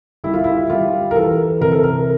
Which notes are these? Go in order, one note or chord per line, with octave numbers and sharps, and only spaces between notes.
G3 E4
F4
E4
G3 F4
A#4
E3 A4
C3 A#4
A4
A#4